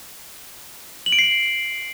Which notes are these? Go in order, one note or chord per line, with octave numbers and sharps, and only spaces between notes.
F#7
D7
C7